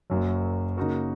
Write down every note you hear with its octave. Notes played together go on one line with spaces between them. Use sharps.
F#1 F#2 F#3
C#3 A#3 D#4 F#4 A#4